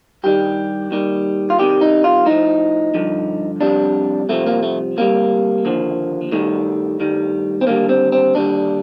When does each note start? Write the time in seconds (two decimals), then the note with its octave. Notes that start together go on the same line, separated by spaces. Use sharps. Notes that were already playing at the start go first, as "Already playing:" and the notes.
0.23 G2 D#3 G3 G4
0.91 D#2 D#3 G3
1.50 F4
1.59 C2 C3 D#3 G3 G4
1.81 D#4
2.04 F4
2.26 A2 F3 D#4
2.94 G2 D3 F3
3.61 F2 C3 G3 D4
4.29 C2 C3 F3 A3
4.46 A#3
4.63 A3
4.97 D2 C3 D#3 G3 A#3
5.65 D#2 D3 F3
6.32 G2 D#3 G3 A3
7.00 G2 D#3 G3
7.61 C4
7.67 D#2 D3 G3 A#3
7.89 C4
8.12 C4
8.34 D#2 D3 G3 D4